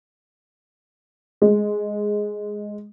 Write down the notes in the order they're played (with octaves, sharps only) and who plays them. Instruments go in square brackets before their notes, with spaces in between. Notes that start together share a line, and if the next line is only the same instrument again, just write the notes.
[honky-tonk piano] G#3